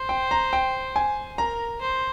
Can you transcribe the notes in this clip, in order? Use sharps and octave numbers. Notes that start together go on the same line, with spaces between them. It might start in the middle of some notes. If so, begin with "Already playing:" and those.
Already playing: C5
G5
A#5
G5
G#5
A#4 A#5
C5